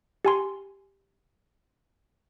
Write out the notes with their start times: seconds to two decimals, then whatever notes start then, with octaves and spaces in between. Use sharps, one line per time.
0.25 G4 G#5 C6